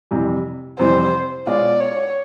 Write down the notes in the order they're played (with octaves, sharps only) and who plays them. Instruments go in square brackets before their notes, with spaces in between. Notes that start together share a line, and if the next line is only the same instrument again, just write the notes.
[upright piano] F2 C3 E3 G3
[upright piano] F2 C3 E3 G3 [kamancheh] C5
[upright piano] B2 G#3 C#4 F4 [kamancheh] D5
[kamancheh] C#5